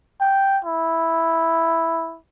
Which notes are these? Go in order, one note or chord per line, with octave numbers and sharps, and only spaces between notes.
G5
E4